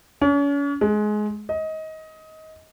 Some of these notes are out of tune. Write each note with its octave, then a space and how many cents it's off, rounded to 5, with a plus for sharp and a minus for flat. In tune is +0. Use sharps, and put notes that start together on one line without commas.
C#4 +40
G#3 +20
D#5 +20